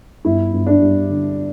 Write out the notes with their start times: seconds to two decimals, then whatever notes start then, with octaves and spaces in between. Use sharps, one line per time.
0.25 G1 E4
0.53 G1
0.67 D4
0.81 G2
1.09 D3